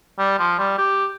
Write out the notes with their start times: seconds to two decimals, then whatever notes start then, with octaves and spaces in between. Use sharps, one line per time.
0.19 G3
0.39 F3
0.59 G3
0.78 G4